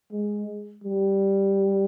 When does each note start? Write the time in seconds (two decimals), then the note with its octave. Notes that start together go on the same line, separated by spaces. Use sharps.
0.12 G#3
0.84 G3